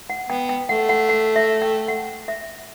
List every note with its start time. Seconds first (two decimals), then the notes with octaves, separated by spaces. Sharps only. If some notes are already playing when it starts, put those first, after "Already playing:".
0.10 F#5
0.29 B3 G5
0.49 G5
0.69 A3 F#5
0.89 F#5
1.09 F#5
1.36 E5
1.62 G5
1.88 F#5
2.28 E5